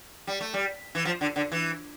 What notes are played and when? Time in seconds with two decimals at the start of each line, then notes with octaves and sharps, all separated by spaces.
0.27 G3
0.41 A3
0.54 G3
0.95 E3
1.05 F3
1.21 D3
1.36 D3
1.52 E3